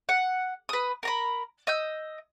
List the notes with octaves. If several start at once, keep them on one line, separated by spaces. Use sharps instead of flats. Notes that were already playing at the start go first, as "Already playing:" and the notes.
F#5
B4 D#6
A#4 A#5 B5
D#5 E6 G6